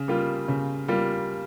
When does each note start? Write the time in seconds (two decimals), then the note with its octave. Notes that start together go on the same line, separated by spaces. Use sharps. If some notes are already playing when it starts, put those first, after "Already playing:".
Already playing: C#3
0.08 G3 A#3 F4
0.48 C#3
0.88 G3 A#3 F4